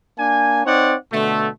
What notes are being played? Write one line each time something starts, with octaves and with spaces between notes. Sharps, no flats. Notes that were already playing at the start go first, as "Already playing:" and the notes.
A#3 D4 G#5
C4 D#4 C#5 D5 F#5
B2 D3 A3